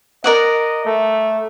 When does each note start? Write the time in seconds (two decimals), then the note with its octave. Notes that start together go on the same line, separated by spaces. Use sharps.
0.24 A#4 D5 D#5 F#5
0.85 A3